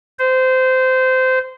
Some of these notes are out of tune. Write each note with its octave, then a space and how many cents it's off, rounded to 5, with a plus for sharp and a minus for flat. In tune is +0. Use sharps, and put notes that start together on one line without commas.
C5 -20